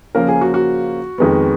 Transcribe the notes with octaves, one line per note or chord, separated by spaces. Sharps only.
C#3 F3 A#3 C#4 A#4
G#4
F#4
F#4
F2 D#3 G#3 B3